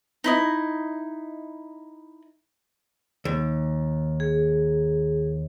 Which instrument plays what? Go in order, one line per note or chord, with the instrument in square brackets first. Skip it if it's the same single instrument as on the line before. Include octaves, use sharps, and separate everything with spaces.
[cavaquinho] D#4 E4 D#5
[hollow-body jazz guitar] D#2
[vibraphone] G#4